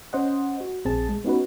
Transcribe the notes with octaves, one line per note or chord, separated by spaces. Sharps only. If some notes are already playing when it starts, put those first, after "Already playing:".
C#4 C5 D#5 F#5
F#4
A#1 C4 G#4 A5
G#3
B3 C#4 D#4 F#4 B4